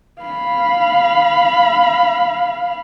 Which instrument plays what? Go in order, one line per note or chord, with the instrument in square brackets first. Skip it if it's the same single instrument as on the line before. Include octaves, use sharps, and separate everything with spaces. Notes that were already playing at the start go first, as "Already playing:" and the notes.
[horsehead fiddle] F5 B5